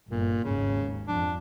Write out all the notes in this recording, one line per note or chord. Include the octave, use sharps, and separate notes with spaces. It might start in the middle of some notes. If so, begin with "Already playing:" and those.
G1 A#2
G#1 D#2 G#2 C#3
F2 F3 D4